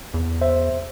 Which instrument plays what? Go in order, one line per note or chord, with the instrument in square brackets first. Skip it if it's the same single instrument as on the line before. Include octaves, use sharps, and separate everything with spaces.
[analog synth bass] E2
[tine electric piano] C5 E5